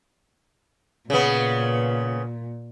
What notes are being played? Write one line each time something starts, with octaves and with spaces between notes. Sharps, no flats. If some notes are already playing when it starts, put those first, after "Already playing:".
A#2 C#3 B3